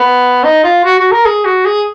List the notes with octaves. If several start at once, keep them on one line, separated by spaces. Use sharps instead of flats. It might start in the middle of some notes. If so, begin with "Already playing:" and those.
Already playing: B3
D#4
F4
F#4
F#4
A#4
G#4
F#4
G#4